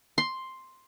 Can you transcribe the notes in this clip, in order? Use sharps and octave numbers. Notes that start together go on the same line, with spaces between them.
C6